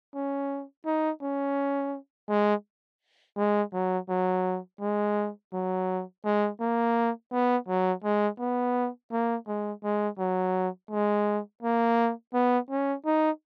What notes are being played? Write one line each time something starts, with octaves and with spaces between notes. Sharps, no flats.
C#4
D#4
C#4
G#3
G#3
F#3
F#3
G#3
F#3
G#3
A#3
B3
F#3
G#3
B3
A#3
G#3
G#3
F#3
G#3
A#3
B3
C#4
D#4